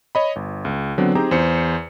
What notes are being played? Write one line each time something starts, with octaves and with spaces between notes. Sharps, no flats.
C#5 D#5 B5
G1
C#2
D3 F#3 B3 C4 D4
C4 D#4 G4 G#4 C5 A#5
E2 C5 C#7